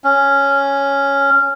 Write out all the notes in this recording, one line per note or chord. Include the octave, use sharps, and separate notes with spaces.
C#4